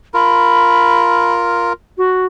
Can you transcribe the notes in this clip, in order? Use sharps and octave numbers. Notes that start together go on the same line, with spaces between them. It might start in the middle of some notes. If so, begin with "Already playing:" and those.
F4 A#4 B5
F#4